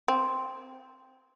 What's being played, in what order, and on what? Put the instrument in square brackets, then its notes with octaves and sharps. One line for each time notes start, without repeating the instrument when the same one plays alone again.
[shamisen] C4